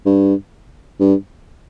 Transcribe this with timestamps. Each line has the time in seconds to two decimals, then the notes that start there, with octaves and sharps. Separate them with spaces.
0.06 G2
1.00 G2